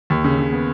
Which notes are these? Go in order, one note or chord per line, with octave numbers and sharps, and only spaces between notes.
D#2
C#3
C#3
B3